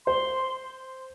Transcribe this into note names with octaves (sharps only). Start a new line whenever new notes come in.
C5 C6